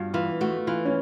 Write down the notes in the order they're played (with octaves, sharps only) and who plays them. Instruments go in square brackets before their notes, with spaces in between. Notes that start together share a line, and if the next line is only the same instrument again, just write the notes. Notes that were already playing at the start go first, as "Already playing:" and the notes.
Already playing: [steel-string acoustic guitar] G2 [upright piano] D4 F4 F#4
[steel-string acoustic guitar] E3 [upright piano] F4
[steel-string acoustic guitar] A3 [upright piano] F#4
[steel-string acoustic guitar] E3 [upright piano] F4
[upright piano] C#4